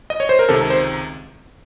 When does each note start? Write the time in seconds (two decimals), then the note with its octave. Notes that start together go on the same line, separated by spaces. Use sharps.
0.10 D#5
0.20 C#5
0.29 C5
0.39 A#4
0.49 C#2 C3 D#3 A4
0.70 C5